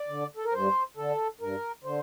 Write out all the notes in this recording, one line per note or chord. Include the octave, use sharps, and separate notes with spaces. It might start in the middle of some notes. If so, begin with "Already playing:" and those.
Already playing: D5
D3
A4
A#4
G2 C5
D3 A4
G2 A#4
D3 C5